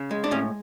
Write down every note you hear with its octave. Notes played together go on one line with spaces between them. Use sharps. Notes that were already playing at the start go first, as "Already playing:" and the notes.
Already playing: C#3
G#3
D4
A2 C#4